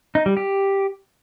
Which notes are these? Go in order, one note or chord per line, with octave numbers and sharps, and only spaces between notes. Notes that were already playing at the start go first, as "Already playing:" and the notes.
D#4
G3
G4